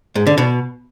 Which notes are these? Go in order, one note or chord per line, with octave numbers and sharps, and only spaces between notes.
G#2
D3
B2